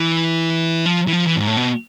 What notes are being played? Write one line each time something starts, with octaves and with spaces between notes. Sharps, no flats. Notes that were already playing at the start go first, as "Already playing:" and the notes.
Already playing: E3
F3
E3
F3
E3
G#2
A2
B2